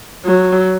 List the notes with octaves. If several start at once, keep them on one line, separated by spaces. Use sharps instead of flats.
F#3